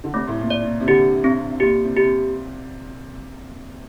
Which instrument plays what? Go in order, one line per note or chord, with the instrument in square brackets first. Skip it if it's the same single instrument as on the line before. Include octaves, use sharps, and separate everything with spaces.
[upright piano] D3
[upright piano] C3 [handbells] A3
[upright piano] A2
A#2
[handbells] D5
[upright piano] A#2
C3
[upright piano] D3 [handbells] G4
[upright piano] C3 [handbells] C4
[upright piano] A#2 [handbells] G4
[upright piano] C3
[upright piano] C3 [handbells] G4